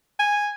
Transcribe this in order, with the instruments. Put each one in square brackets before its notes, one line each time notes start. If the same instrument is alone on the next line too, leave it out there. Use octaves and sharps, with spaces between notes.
[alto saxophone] G#5